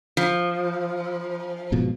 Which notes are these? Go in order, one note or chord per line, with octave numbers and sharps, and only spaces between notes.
F3
G#2 B2 F3